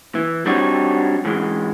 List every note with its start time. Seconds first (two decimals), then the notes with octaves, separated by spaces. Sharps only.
0.15 E3
0.46 G3 C4 D4 D#4 F#4 C#5
1.25 G#2 E3 G#3